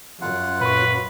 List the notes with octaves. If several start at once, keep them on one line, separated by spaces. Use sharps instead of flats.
F#2 F4 F#5
A#2 B4 C#6